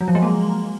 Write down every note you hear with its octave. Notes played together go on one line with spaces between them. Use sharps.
F#3
F3
G#3
A#3